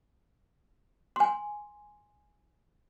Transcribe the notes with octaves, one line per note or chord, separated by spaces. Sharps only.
G#5 C6